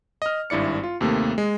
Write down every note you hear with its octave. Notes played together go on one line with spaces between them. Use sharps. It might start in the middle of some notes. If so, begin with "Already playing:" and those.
D#5 F6
G#1 G2 E4 D5 C#7
F4
D#2 C3 A3 A#3
G#3